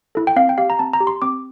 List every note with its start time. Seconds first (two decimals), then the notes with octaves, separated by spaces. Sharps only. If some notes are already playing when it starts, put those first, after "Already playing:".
0.15 E4 A4
0.27 G5
0.36 C4 F5
0.49 G5
0.58 G4 F5
0.70 A#5
0.79 C4 A5
0.93 A#5
1.00 G4
1.07 C6
1.22 C4 D6